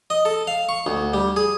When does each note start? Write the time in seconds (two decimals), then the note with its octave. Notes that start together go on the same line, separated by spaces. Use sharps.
0.10 D#5
0.25 A4
0.47 F5
0.69 C#6
0.86 D2
1.14 G3
1.36 G#4